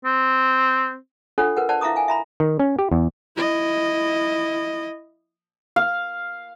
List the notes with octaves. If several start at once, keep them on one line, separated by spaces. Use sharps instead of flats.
C4
D4 F4 A4 C#5 F#5
A#4 B4 F#5
C5 D5 F#5 A5
E4 E5 F5 A#5 D6 D#6
F5 G#5
E5 A#5 B5
D#3
C#4
G4
E2
E4 D#5
F5